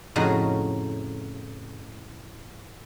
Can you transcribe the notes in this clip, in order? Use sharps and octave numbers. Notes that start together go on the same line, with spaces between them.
F2 A2 C#3 D#4 F#4 D#5